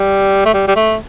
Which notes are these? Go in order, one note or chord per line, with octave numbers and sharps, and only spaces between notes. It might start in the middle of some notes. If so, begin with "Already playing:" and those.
Already playing: G3
A3
G3
G3
A3